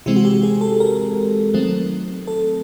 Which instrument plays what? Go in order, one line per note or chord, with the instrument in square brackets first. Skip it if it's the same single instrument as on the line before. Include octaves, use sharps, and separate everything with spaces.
[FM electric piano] C3 E3 G#3 C4 E4
F#4
G4
G#4
A4
A#4
D#3 F#3 A3 C4
A4